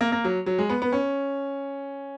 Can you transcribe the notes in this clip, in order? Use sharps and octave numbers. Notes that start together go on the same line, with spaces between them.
A#3
A#3
F#3
F#3
G#3
B3
B3
C#4